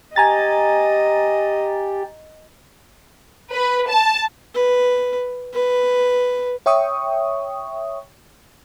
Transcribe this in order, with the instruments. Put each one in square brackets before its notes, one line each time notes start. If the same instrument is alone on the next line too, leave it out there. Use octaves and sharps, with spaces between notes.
[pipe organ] G4 [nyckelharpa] D#5 [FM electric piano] G#5 A#5 A6
[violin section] B4
A5
[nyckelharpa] B4
B4
[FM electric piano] C#5 E5 G5 C#6 D#6